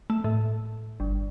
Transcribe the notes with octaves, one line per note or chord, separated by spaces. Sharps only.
A3
A2
G1